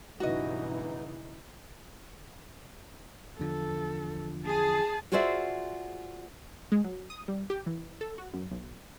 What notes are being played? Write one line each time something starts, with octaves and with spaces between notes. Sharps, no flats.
B1 G2 C#3 E3 D#4 F#4 D#5
E2 D3 F3 A4
G#4 A5
F4 F#4 G#4 C5 D5 E5
G#3
F#3
D#6
G3
G4
E3
A4
F#4
F#2
B1